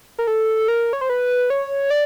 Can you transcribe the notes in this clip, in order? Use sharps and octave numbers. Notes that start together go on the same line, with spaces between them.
A#4
A4
A#4
C#5
C5
B4
C#5
D5